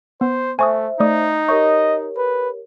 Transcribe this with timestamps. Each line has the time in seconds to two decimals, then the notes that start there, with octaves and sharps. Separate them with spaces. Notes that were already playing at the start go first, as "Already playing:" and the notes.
0.21 B3 C5
0.59 A3 C5 E5 G#5 C#6 D#6
1.00 A3 D#4 D5 D#6
1.49 G4 A#4 C#5 D#5 C#6 G6
2.17 B4